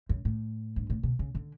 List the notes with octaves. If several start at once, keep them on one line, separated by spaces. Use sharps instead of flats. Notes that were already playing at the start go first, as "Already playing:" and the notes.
F#2
A2
G2
A2
B2
C#3
D3